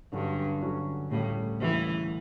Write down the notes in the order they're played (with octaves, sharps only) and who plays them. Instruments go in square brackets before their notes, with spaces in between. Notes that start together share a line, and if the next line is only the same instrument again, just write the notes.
[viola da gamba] G2 [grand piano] D3 F#3 C#4 F#4
[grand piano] D3 F#3 C#4 F#4
[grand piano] D2 C#3 G3 [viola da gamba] A2
[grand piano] D2 C#3 G3 [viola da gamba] E3